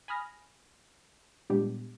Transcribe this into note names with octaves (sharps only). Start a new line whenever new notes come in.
G#5 B5 D#6 F6 A#6
A#2 G3 G#3 B3 D4 G4